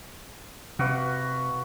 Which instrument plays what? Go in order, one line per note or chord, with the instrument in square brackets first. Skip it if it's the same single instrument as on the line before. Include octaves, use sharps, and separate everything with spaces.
[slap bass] C3 [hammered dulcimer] F#4 B4 F5